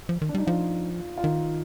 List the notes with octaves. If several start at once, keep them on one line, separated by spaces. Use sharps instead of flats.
F3
D#3
D4
G3 D#4
F3 F4
F4
D#3 D#4